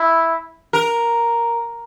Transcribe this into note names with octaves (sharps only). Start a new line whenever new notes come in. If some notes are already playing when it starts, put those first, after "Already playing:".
Already playing: E4
A#4